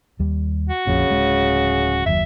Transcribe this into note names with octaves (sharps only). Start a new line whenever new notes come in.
D#2 G3
F#4
A#1 F2 A#2 C#3
D1 G#3
F#1 D#2 F#3 E5